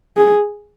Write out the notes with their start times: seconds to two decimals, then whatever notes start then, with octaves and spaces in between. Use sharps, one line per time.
0.17 G#4